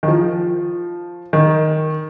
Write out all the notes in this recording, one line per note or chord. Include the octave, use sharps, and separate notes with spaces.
D#3
F3
D#3